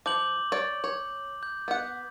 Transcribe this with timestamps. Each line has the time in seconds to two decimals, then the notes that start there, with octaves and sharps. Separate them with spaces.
0.06 F3 D6 G6 F#7
0.52 C#5 D5
0.84 C#5
1.43 G6
1.68 B3 F#5